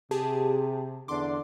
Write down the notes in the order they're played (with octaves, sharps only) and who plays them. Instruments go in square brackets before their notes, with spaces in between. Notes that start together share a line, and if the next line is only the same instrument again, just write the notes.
[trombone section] C3 [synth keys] G4 G#4 A5
[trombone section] E2 D3 D4 [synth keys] C6 D6